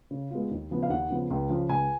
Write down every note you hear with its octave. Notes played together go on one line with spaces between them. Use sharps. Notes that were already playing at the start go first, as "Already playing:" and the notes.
C#3
G#3 B3 F4
D#2
C#3 F3 B3
F5
D#2 F#5
C#3 F3 B3
C#2
C#3 F3
C#2 G#5